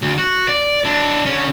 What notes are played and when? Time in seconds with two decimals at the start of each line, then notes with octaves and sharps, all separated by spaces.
0.02 D2
0.18 F#4
0.48 D5
0.85 D4 E4
1.25 D3 C#4